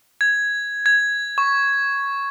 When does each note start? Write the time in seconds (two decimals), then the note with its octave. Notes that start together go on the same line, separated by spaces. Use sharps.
0.21 G#6
0.86 G#6
1.38 C#6